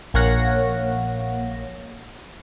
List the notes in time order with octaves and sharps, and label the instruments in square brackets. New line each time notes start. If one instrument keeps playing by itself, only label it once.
[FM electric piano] A#1 A#3 C#5 F5 F#5 A#6